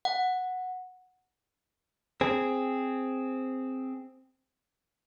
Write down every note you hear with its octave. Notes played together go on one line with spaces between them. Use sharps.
F#5
C4 G#4